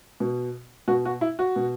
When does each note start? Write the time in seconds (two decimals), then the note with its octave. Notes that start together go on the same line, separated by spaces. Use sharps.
0.20 B2
0.88 B2 F#4
1.05 F#4
1.21 E4
1.39 F#4
1.56 B2